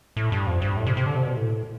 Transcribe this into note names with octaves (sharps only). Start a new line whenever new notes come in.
A2
G2
F2
G2
A2
C3
C3
D3
C3
B2
A2